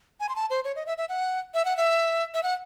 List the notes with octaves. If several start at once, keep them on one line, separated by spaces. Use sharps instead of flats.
G#5
C6
A5
C5
C#5
D#5
E5
E5
F#5
E5
F#5
E5
E5
F#5